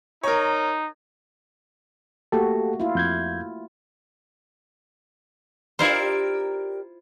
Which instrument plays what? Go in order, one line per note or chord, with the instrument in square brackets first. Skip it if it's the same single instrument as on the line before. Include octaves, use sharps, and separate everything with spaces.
[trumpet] D#4 [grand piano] A#4 C#5
[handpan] A3 A#3 F#4 [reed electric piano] G4 A4
[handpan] E4 F4
[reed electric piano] F2 G6 G#6
[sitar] D4 G4 A#4 [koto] E4 F4 C5